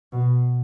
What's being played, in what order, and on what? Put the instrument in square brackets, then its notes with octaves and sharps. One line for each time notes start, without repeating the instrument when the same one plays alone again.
[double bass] B2